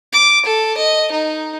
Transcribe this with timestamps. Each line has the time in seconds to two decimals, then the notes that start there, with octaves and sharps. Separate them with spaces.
0.13 D6
0.45 A4
0.77 D#5
1.11 D#4